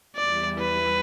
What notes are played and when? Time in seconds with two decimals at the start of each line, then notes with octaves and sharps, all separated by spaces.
0.16 E2 E3 G3 E4 D5
0.59 B4